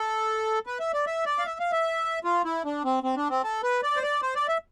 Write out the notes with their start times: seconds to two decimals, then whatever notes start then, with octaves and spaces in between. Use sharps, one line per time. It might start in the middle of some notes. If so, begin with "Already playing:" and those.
Already playing: A4
0.67 B4
0.80 E5
0.93 D5
1.07 E5
1.26 D5
1.39 F5
1.46 E5
1.60 F5
1.72 E5
2.24 F4
2.45 E4
2.65 D4
2.85 C4
3.03 C4
3.16 D4
3.30 C4
3.44 A4
3.63 B4
3.83 D5
3.96 C5
4.03 D5
4.22 C5
4.35 D5
4.48 E5